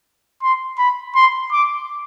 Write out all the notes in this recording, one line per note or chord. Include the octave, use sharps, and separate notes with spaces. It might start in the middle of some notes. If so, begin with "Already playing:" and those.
C6
B5
C6
D6